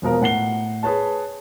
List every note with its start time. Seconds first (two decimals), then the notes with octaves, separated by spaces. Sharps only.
0.02 E1 B2 F3 A#4
0.21 A2 F#5 C7 G7
0.83 G#4 B4 C#5 A5